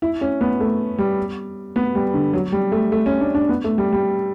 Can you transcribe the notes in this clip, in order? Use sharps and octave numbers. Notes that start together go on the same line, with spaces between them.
E4
C#4
B3
A3
G3
B3
G3
D3
F#3
G3
A3
A3
C#4
D4
D4
B3
A3
G3
G3